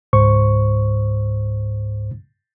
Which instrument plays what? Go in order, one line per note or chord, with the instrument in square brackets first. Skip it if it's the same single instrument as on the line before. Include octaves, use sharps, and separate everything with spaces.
[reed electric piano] C#2 G#2 C5 C#6